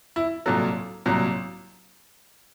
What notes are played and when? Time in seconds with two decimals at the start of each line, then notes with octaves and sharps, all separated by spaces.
0.16 E4
0.46 C2 A#2 F#3 A4
1.06 C2 A#2 F#3